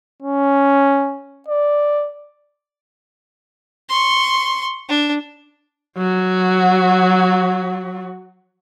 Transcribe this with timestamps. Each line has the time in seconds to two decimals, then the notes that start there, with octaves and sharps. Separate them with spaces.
0.23 C#4
1.49 D5
3.89 C6 C#6
4.89 D4
5.97 F#3 F#4